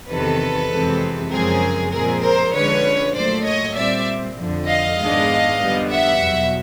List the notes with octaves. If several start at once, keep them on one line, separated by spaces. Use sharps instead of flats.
E2 C3 D#3 A4 B4
F2 C3 E3 G#3 C4
F#2 C#3 F3 G#3 C4 G#4 A#4
A#2 F3 G#3 C4 G#4 A#4
A#4 C5
D3 F3 G#3 C#4 B4 C#5
A#2 F#3 A3 C5 D5
C#5 D#5
A#2 G3 C4 D5 E5
F2 D3 F3
D#5 F5
G#2 D#3 G#3 B3 D4
F2 D3 G3 B3
E5 F#5
E2 B2 F#3